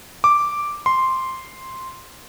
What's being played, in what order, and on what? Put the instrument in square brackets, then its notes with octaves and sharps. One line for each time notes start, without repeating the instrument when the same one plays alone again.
[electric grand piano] D6
C6